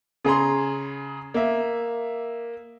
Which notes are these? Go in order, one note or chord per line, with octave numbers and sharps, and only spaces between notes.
C#3 G#4 A#5 C6
A#3 E5